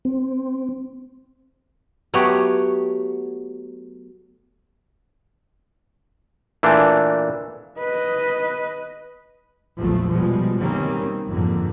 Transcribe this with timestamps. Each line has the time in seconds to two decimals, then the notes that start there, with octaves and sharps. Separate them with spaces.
0.05 C4
2.14 F#3 A3 B3 F#4 G4 C#5
6.63 A#2 E3 A3 D4
7.79 B4 D#5
9.78 A#1 E2 F3 F#3 A3
10.10 B2 F3 G3 G#3
10.59 B2 D#3 G3 A#3 C4 C#4
11.30 F2 G#2 D3 A#3